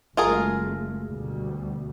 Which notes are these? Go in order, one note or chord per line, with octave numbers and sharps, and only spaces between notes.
F#1 G#3 A3 F4 G#4 A#4
D2 B2 G3